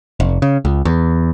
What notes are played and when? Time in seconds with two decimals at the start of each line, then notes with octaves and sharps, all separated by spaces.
0.20 F1
0.42 C#3
0.65 C#2
0.85 E2